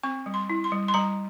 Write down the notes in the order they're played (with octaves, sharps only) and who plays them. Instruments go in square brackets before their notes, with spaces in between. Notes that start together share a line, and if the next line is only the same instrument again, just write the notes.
[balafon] C4 C#6
G3
C6
E4
C6
G3
C6
G3 A#5